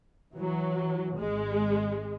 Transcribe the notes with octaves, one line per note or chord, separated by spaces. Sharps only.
E3 F#3
G#1 G#3